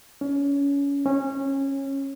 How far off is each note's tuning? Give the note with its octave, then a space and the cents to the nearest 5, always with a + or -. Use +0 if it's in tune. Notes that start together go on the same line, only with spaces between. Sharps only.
C#4 +25
C#4 -20